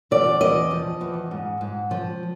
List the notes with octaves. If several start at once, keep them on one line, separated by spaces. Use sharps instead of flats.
E2 D5
E2 D#5
F3
E2
G#2
G#2
F3